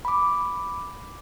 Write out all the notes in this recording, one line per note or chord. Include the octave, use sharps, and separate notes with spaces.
B5 D6